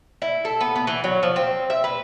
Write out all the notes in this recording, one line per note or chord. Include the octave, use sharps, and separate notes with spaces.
E4
A4
B3
B3
E3
F#3
F3
C4
E5
B4